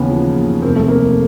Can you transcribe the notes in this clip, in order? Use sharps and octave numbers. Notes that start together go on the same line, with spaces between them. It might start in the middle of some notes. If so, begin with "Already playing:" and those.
Already playing: D#2 C#3 E3 B3 C#4
F3
D#2
F1 A#3 C4
A3
F2 A#3